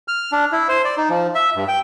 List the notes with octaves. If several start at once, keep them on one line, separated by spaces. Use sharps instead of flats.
F6
D4
E4
C5
D5
D#4
F3
E5
G2
G5